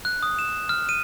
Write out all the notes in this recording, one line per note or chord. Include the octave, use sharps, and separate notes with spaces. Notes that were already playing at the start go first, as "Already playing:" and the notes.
F#6
D#6
E7
F6
D#7